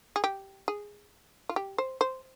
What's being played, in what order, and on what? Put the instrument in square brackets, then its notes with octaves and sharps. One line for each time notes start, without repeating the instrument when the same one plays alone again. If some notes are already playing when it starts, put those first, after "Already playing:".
[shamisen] G#4
G4
G#4
F4
G4
C5
C5